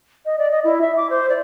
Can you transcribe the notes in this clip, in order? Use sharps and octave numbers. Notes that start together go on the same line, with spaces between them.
D#5
D5
D#5
E4
E5
D6
C5
D5